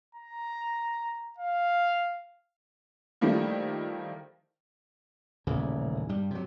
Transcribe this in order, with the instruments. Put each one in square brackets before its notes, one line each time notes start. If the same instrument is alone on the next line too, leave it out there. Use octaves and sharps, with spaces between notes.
[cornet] A#5
F5
[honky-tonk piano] D#3 F3 G3 A3 A#3 E4
[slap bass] D#1 A1 D#2 C#3
G2 G3
C3 F#3